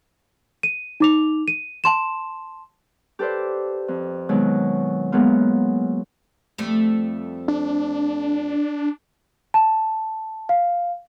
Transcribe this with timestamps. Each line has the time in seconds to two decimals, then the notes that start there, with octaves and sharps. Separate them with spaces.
0.63 D#7
1.00 D#4 D6 F7
1.48 D#7
1.84 A5 C6 E7
3.19 G4 A4 B4 C5 D5
3.88 F2
4.29 B2 D#3 F#3 G#3
5.12 F#3 G#3 A#3 B3 F4
6.58 F2 G3 A3
7.48 D4
9.54 A5
10.49 F5